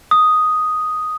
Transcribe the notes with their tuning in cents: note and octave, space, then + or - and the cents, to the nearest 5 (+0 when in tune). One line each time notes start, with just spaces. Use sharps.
D#6 +0